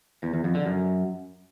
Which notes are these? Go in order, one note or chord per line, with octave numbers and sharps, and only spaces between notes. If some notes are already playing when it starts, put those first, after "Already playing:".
E2
E2
F2
D3
F#2